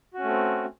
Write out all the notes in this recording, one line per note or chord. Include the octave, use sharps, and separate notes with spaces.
A3 C4 C#4 F#4